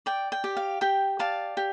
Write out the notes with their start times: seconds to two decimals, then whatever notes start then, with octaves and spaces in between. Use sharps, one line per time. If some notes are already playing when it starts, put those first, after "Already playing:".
0.06 D5 G5
0.32 G5
0.44 G4
0.57 F5
0.81 G4 G5
1.19 D5 F5 A5
1.57 G4